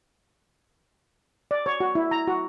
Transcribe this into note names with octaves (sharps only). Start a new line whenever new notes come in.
D5
C#5
F#4
E4
A#5
F#4